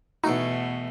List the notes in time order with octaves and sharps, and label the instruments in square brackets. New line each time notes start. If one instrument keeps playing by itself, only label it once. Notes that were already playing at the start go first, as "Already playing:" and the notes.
[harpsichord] E2 E4 F#4 [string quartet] B2 A3 [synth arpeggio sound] D#4